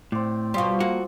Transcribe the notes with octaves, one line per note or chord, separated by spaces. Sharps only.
A2 C4 D5
B2 F3 G3 C6
A#3 F#4